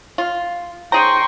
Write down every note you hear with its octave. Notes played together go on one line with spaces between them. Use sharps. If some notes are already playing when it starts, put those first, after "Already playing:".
F4
D#4 G#4 C5 G5 A#5 C6 C#6